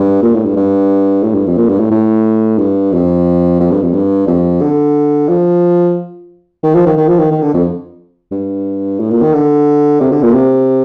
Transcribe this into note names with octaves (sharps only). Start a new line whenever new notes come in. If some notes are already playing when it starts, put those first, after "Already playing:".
Already playing: G2
A#2
A2
G2
G2
A2
G2
F2
A#2
G2
A2
A2
G2
F2
F2
G2
F2
G2
F2
D3
F3
D#3
F3
D#3
D#3
F3
D#3
D#3
D3
F2
G2
A2
A#2
D#3
D3
C3
D3
A#2
C3